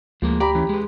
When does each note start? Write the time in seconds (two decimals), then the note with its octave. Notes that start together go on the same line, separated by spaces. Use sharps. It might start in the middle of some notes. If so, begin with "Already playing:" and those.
0.22 D2 F3 G#3 A#3
0.40 G4 D5 A#5 B5
0.55 E3 C#4
0.69 G#3 B4